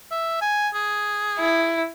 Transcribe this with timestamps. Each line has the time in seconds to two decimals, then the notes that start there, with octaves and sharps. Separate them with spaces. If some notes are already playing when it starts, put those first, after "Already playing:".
0.11 E5
0.41 G#5
0.74 G#4
1.39 E4